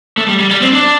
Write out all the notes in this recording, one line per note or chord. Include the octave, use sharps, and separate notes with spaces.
A3
G3
G3
G3
C4
D4